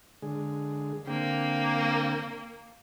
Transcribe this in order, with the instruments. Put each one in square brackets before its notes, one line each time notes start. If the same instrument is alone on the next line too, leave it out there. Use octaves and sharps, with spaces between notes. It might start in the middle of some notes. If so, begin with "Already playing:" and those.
[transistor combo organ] D3 G#3 G#4
[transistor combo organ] D3 C4 G5 [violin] A#3